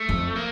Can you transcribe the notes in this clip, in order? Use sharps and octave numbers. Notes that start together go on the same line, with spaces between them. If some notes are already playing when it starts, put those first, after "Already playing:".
Already playing: A3
F2
A#3